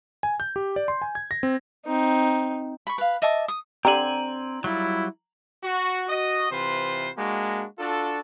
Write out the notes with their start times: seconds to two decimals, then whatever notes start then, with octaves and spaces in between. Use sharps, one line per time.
0.23 G#5
0.40 G6
0.56 G4
0.76 D5
0.88 C6
1.02 G#5
1.15 G#6
1.31 A#6
1.43 C4
1.86 C4 D#4
2.87 B5 C#6
2.98 B4 F5
3.22 D#5 E5 A5 D6
3.48 D#6
3.85 D3 C4 G4 G#5 A#5 F#7
4.64 F#3 G3 E4 F4
5.63 F#4
6.09 F#4 D#5
6.51 C3 E3 F4 B4 C5
7.17 G#3 A#3 D4 F#4
7.79 D4 F4 F#4 A4